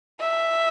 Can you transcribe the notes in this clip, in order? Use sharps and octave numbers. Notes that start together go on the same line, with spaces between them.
E5